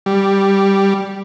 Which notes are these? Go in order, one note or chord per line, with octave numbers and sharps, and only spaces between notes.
G3